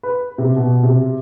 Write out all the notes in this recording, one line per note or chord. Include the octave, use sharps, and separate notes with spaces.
B4
C3
B2
C3